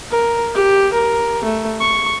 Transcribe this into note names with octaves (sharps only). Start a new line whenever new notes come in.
A#4
G4
A#4
A3
C#6